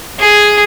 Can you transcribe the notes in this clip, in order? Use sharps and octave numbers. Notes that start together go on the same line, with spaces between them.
G#4